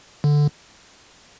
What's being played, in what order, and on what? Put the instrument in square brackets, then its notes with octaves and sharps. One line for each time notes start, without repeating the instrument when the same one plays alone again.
[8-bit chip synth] D3